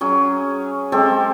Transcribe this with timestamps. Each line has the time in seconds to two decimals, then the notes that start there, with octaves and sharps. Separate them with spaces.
0.01 F#3 C#4 G#4
0.92 G#3 C4 G4 A4